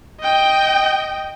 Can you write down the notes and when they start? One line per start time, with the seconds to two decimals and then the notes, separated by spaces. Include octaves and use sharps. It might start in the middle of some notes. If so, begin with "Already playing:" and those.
0.21 D#5 G5